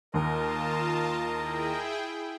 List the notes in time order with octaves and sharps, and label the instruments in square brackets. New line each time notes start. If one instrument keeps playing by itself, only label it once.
[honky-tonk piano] D#2 [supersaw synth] F4 A5 [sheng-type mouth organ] A#4 D#5
[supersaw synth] E4 G#4 G5